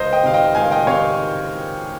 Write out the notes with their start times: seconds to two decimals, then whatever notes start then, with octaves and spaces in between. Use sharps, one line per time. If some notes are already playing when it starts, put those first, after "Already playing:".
Already playing: C#2 C5 D#5
0.13 D#5 G5
0.23 C3 D#3 F5
0.34 D#5 G5
0.55 C#2 F5 G#5
0.71 D#5 G5
0.87 C3 D#3 C#5 F5